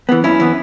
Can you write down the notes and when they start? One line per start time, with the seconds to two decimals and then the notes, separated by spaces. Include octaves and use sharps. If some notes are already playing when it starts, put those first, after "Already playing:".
0.09 E3 B3
0.24 F#2 C#4 E4
0.40 E3 B3